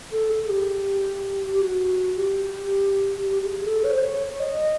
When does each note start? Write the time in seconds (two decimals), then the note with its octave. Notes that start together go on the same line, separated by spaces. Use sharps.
0.12 A4
0.30 G#4
0.49 G4
1.53 G4
1.61 F#4
2.16 G4
3.27 G4
3.42 G4
3.46 G#4
3.66 A4
3.84 C#5
3.91 C5
4.00 C#5
4.40 D#5